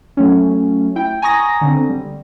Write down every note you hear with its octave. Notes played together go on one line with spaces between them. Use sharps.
F#3 A3 C#4
E4 G5
G#5 A#5 C#6 D#6 A#6
D3 C4
G3